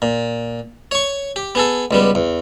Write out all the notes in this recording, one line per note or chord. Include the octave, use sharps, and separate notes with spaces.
A#2
C#5 C#6
G4
B3 G#4 A4
C#2 G3 B3
E2